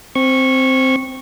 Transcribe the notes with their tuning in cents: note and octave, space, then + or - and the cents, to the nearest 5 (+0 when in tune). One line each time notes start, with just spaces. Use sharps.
C4 +0 C#6 -15